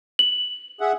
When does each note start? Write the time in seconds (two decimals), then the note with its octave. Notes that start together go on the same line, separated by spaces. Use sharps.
0.19 F#7
0.81 G#4 E5 F#5